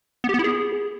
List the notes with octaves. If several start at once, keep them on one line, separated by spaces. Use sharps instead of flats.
B3
G4
B3
E4
G#4